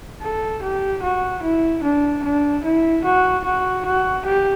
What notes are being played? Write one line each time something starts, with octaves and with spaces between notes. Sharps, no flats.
A4
G4
F#4
E4
D4
D4
E4
F#4
F#4
F#4
G4